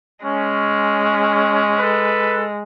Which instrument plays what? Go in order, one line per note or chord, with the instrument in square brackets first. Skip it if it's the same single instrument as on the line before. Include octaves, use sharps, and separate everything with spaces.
[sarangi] G#3 [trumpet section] C#4
[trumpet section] A4 B4